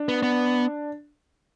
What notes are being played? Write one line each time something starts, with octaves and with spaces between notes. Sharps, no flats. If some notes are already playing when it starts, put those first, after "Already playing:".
Already playing: D4
B3
B3